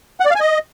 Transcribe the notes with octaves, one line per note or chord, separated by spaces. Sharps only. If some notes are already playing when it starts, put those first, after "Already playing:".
F#5
D5
F5
G#5
D#5